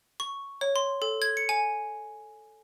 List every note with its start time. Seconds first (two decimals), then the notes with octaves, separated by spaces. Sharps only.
0.20 C#6
0.61 C#5
0.76 C6
1.02 A4
1.22 G#6
1.37 C#7
1.49 G#5